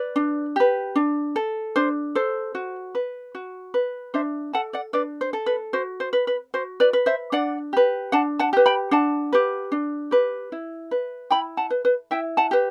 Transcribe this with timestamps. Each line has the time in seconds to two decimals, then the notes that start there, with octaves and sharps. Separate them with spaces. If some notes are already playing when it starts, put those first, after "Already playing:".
Already playing: B4 D5
0.16 D4
0.56 G4 B4
0.96 D4
1.36 A4
1.76 D4 C5
2.15 A4 C5
2.55 F#4
2.95 B4
3.35 F#4
3.74 B4
4.14 D4 C5 E5
4.53 A4 F#5 A5
4.73 D5 F#5
4.93 D4 B4 D5
5.21 C5
5.33 A4
5.46 B4
5.73 F#4 C5
6.00 C5
6.13 B4
6.27 B4
6.54 F#4 C5
6.80 B4 D5
6.93 B4
7.06 C5 E5
7.32 D4 D5 F#5
7.73 G4 B4
8.12 D4 F#5 A5
8.39 F#5 A5
8.53 G4 B4
8.66 G5 B5
8.91 D4 F#5 A5
9.33 G4 B4
9.72 D4
10.11 G4 B4
10.52 E4
10.91 B4
11.31 E4 G5 B5
11.57 F#5 A5
11.70 B4
11.85 B4
12.11 E4 E5 G5
12.37 F#5 A5
12.51 G4 B4